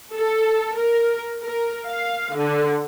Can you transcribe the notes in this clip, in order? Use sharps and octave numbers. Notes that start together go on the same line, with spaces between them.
A4
A#4
A#4
F5
D3